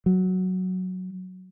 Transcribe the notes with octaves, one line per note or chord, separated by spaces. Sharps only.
F#3